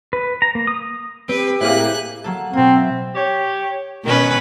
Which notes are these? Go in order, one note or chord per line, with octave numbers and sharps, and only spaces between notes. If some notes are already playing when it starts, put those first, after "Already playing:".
B4
A#5
A#3
D#6
C4 G4 B4
A2 C3 A#3 E4 G#4 F#6
F#3 A#3 A4
B2 A#3 C4
E5
G4 C#5
B2 D#3 C#4 B4